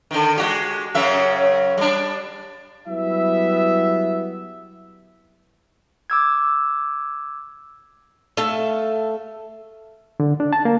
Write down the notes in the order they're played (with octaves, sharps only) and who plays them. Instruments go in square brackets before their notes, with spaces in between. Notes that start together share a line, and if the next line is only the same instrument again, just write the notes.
[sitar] D3 D#3
G#3 F#4 G4
F#2 C#3 E5
G3 D4
[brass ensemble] F#3 G3 B3 E4 E5
[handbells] D6 E6 G#6
[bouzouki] A3 A4 E5 F5
[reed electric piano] D3
D4
A5
A#3